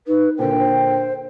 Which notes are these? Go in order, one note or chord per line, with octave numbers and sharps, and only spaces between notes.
D#4 B4
A#2 D3 C5 G5
C5